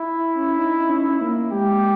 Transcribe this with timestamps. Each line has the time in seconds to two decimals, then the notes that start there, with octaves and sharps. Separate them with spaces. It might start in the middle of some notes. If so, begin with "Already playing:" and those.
Already playing: E4
0.35 C#4
0.59 D#4
0.78 D#4
0.89 C#4
1.21 A#3
1.52 G#3 G4